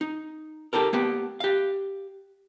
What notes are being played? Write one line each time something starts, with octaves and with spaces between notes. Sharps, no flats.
D#4
D#4 G4 A4 A#4
A#3 B3 G4
G4 F5